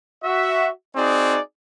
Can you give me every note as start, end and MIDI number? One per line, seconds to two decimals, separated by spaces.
0.24 0.68 66
0.24 0.68 76
0.96 1.39 60
0.96 1.39 63
0.96 1.39 66
0.96 1.39 68
0.96 1.39 74